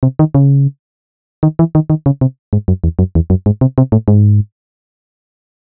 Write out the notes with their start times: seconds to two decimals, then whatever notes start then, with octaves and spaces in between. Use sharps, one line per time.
0.03 C3
0.19 D#3
0.35 C#3
1.43 D#3
1.59 E3
1.75 D#3
1.90 D#3
2.06 C#3
2.21 C3
2.53 G#2
2.68 F#2
2.84 E2
2.99 F#2
3.15 E2
3.30 F#2
3.46 G#2
3.61 C3
3.78 C3
3.92 A2
4.08 G#2